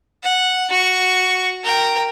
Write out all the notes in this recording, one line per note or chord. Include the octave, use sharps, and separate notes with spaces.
F#5
F#4 C#6
A#4 G5